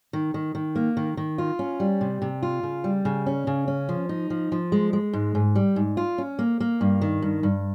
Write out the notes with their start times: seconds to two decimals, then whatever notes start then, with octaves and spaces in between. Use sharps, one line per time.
0.13 D#3
0.34 D#3
0.55 D#3
0.76 A#3
0.97 D#3
1.17 D#3
1.38 F4
1.59 C#4
1.80 G3
2.01 C3
2.22 C3
2.43 F4
2.63 C#3
2.84 G3
3.05 C#3
3.26 C#4
3.47 C#3
3.68 C#4
3.89 F3
4.09 D#4
4.30 F3
4.52 F3
4.72 G#3
4.93 G#3
5.13 G#2
5.35 G#2
5.55 G3
5.76 G#2
5.97 F4
6.18 C#4
6.39 A#3
6.60 A#3
6.81 G2
7.01 D#3
7.22 G2
7.43 G2